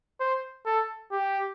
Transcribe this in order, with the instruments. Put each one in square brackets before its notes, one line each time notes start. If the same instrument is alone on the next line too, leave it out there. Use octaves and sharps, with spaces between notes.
[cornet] C5
A4
G4